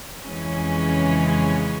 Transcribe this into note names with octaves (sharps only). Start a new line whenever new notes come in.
F2 C#3 E3 G#3 C#4